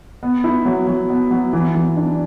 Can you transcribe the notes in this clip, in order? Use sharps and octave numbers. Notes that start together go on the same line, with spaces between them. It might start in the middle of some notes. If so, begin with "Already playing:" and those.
B3
E4
F#3
F#3
B3
F#3
E3
E3
D4